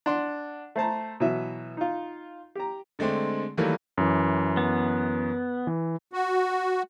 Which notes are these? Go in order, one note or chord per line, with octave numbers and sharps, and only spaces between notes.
D4 F#5 C6
A3 C5 A5 A#5
B2 E3 F#3 E5
D#4 F4
G4 A#5
D3 G#3 A3 C4 D4
D#3 E3 F#3 G3 A3 A#3
F#2 E3
B3
E3
F#4